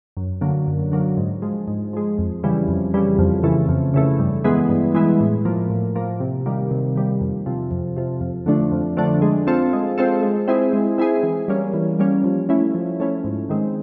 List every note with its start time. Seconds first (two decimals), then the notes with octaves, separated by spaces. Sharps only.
0.17 F#2
0.41 D3 F#3 A#3
0.67 F#2
0.92 D3 F#3 A#3
1.17 G#2
1.42 F3 G#3
1.68 G#2
1.93 F3 G#3
2.18 F2
2.44 C#3 E3 G3
2.68 F2
2.94 C#3 E3 G3
3.19 F2
3.43 C#3 E3 A3
3.69 F2
3.94 C#3 E3 A3
4.19 G2
4.44 E3 G#3 B3 E4
4.69 G2
4.95 E3 G#3 B3 E4
5.20 A2
5.45 F3 A#3
5.70 A2
5.95 F3 A#3
6.20 C3
6.46 D#3 G3 A#3
6.71 C3
6.96 D#3 G3 A#3
7.21 F2
7.46 C3 F3
7.71 F2
7.96 C3 F3
8.21 F2
8.46 D3 F3 A3 D4
8.72 F2
8.97 D3 F3 A3 D4
9.22 G#3
9.47 C4 F4 A4
9.73 G#3
9.98 C4 F4 A4
10.23 G#3
10.48 C4 E4 G#4
10.73 G#3
10.98 C4 E4 G#4
11.23 E3
11.48 G3 A#3 C#4
11.74 E3
11.99 G3 A#3 C#4
12.24 F3
12.49 A3 C#4 E4
12.75 F3
13.00 A3 C#4 E4
13.24 G#2
13.49 D#3 G#3 C4